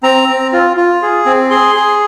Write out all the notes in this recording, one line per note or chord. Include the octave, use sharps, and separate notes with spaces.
C4 A#5
C4
F4
F4
G#4
C4
G#4 C6
G#4